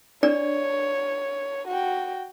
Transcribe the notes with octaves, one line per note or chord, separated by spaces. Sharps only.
D4 C#5 D5
F#4 G5